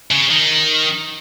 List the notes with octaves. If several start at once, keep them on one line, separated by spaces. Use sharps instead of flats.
C#3
D#3